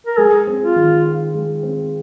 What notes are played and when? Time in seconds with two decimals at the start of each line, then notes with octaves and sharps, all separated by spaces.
0.07 A#4
0.18 G#3 G#4
0.47 C4
0.61 F4
0.76 D#3
1.05 F4
1.34 G#3
1.63 C4